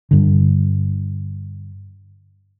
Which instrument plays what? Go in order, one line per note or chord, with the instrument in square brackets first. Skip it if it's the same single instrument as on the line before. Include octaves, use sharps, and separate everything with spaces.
[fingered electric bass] G2 D3